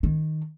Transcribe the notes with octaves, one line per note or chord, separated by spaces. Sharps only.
D#3